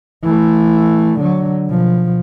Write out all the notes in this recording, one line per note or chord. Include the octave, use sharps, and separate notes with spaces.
E3 A3
D3 F#3
B2 F3